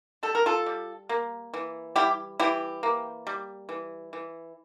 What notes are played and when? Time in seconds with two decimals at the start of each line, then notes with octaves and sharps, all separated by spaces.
0.23 G3 A4
0.35 A#4
0.46 F4 A4
0.66 G3
1.09 A#3
1.54 E3
1.96 G3 E4 G4
2.40 E3 E4 G4
2.83 A#3
3.27 G3
3.69 E3
4.13 E3